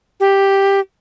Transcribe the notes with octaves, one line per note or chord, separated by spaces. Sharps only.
G4